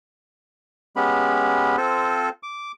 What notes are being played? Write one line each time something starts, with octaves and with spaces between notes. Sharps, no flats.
G#3 B3 C#4 G4 B5
C4 F4 A4 C5
D6